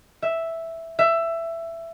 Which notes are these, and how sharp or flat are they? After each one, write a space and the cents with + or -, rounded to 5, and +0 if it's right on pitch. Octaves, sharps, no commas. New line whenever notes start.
E5 +0
E5 +15